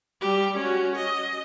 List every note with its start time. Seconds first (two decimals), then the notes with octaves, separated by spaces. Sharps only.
0.21 G3 G4
0.58 C#4 F#4
0.96 D#5